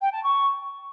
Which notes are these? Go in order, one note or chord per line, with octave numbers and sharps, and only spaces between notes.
G5
A5
C#6